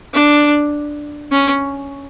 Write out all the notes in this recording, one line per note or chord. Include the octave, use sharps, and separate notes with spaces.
D4
C#4